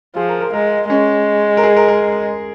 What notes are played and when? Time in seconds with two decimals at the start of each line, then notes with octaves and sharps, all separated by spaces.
0.16 F3 G#4
0.28 A#4
0.41 A#4
0.53 G#3 A#4
0.90 G#3 C#4
1.57 A#4
1.63 G#4
1.77 A#4
1.88 A#4